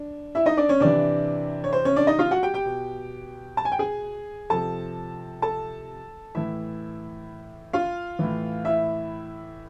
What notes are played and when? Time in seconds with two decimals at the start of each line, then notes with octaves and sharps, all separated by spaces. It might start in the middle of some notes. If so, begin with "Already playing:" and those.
Already playing: D4
0.35 E4 E5
0.46 D#4 D#5
0.57 D4 D5
0.69 C#4 C#5
0.80 C3 E3 D4 D5
1.64 C#5
1.73 C5
1.85 C#4 C#5
1.96 D4 D5
2.07 D#4 D#5
2.19 F4 F5
2.31 F#4 F#5
2.43 G4 G5
2.54 G4 G5
2.65 B2
3.57 A5
3.65 G#5
3.72 G5
3.79 G#4 G#5
4.50 C3 F3 A4 A5
5.42 A4 A5
6.35 A2 E3 E4 E5
7.73 F4 F5
8.19 A2 E3
8.65 E4 E5